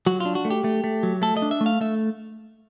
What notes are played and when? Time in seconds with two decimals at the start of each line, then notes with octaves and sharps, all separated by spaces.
0.06 F#3 F#4
0.20 D4 F4
0.35 F#4
0.45 A3
0.50 G4
0.64 A3
0.84 A3
1.03 F#3
1.22 A3 A4
1.37 D#5
1.42 D4
1.51 E5
1.61 A3
1.66 F5
1.81 A3 E5